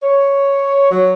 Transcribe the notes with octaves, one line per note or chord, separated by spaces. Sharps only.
C#5
F#3